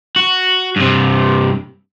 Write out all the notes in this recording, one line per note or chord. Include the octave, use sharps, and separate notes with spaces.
F#4
G2 C3